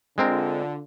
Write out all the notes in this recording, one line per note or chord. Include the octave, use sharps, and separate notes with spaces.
D3 G#3 C4 F4 A#4